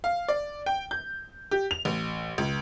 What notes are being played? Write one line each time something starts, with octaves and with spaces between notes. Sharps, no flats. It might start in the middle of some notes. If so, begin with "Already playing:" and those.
F5
D5
G5
G6
G4
F7
A1
C#2